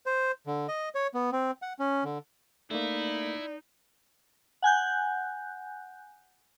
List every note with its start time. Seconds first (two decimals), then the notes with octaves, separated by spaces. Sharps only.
0.06 C5
0.47 D3
0.68 D#5
0.95 C#5
1.14 B3
1.32 C4
1.62 F#5
1.79 C#4
2.04 D3
2.71 A3 A#3 D#4 E4 D5
4.62 F#5 G#5 F#6 G6